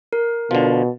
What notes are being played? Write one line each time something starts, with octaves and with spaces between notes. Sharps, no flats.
A#4
B2 D3 F3